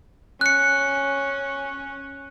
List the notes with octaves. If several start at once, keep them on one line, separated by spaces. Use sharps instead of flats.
C#4 F#6 C#7